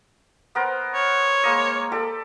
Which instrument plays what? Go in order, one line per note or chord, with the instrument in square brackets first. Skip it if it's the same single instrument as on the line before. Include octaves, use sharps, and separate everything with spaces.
[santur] B3 A#4 C5
[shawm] C#5
[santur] G#3 A#3 D#5
G4 A4 D5